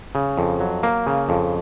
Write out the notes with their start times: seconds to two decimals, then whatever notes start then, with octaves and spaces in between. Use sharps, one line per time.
0.15 C#3
0.38 F2
0.60 F#3
0.83 A#3
1.06 C#3
1.29 F2